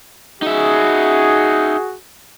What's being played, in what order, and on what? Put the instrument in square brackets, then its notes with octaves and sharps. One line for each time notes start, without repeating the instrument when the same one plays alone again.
[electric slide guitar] D#4 E5 [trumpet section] F#4 G#4